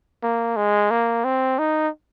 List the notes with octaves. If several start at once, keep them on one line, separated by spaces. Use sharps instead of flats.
A#3
G#3
A#3
C4
D#4